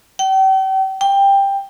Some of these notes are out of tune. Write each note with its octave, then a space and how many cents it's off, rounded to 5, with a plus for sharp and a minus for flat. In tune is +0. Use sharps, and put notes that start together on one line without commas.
G5 -40
G5 +15